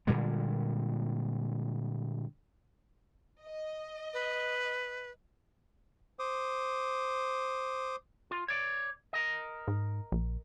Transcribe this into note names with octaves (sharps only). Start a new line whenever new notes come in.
A#2 D3 G3 G#3
D#5
B4
C5 D6 D#6
F4
C#5 D5
A#4 D#5
G#2
A#1